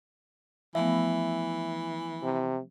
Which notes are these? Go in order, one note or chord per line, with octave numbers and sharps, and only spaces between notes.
E3 F3 A3 B3 E5
C3